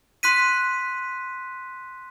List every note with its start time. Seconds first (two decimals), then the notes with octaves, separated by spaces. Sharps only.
0.23 C6 F#6 B6 D#7